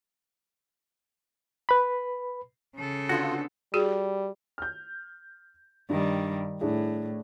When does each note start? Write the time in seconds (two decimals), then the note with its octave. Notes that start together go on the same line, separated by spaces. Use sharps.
1.69 B4 B5
2.76 C#3 A4
3.09 D3 B3 C4 F4 F#4
3.74 G3 F#4 G#4
4.58 F6 G6
5.89 G2 D#3 G3
6.61 A2 D4 E4 G#4